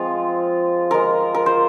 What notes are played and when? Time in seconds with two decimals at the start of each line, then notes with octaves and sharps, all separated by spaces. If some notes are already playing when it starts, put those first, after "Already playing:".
Already playing: F3 G#3 C4 F4
0.91 G#3 F4 A#4
1.35 A#4
1.46 C5